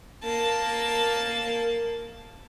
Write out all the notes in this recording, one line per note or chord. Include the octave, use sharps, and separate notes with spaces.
A#3 A5